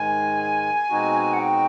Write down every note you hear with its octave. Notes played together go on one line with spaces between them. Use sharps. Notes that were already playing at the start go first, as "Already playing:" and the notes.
Already playing: G#2 D#3 G#3 G#5
B2 G#3 C4 D#4 F#4
F#5
G5